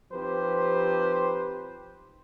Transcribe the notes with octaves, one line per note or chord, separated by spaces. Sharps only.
F3 C4 D#4 G4 B4 C5